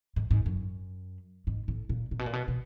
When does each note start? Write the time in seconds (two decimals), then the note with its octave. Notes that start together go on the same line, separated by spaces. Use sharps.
0.16 G#2
0.31 G#2
0.46 F#2
1.47 G#2
1.68 A2
1.89 A#2
2.11 A#2
2.19 B2
2.26 A#2
2.33 B2
2.48 B2